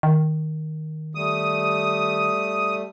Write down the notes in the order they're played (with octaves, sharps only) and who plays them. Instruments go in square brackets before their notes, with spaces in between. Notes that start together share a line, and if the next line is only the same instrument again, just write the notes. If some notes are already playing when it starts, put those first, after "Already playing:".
[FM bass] D#3
[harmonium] G3 A3 [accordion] D#6